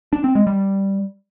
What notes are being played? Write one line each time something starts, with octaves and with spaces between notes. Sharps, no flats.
D4
C4
G#3
G3